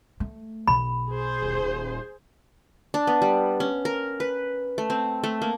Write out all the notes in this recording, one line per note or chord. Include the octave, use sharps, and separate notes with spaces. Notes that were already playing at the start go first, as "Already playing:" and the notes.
A3
B1 B3 B5
G#4 C5
D#1
D4
B3
G3
C#4
A#4
B4
A3
C4
A3
A#3